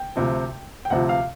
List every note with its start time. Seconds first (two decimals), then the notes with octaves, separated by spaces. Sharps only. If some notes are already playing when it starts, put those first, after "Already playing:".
Already playing: G5
0.16 D2 C3 F3
0.85 G5
0.90 D2 C3 F3 F#5
1.09 F5